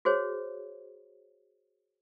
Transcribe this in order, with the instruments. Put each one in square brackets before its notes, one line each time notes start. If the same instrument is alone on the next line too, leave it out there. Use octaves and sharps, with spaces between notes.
[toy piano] F#4 G#4 C5 C#5